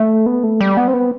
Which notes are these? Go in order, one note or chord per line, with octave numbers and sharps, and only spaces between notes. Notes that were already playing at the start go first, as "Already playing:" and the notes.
Already playing: A3
B3
A3
G3
B3
C4
B3